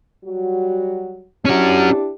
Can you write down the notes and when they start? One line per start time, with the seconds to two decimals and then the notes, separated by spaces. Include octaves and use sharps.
0.25 F#3 G3 F#4
1.45 C#4 D4 E4 F#4 G4